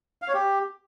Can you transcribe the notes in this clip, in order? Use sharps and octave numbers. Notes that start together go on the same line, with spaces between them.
F5
C#5
G4